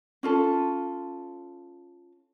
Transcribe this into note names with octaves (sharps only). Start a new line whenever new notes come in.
C#4 F4 A4